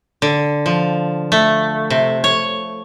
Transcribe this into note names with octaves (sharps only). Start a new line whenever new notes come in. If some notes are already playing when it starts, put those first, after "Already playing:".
D3
F3
A3
C3
C#5